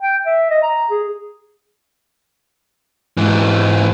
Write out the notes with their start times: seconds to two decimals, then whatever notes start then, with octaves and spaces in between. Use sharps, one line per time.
0.01 G5
0.26 E5
0.50 D#5
0.63 A#5
0.90 G#4
3.17 G#2 E3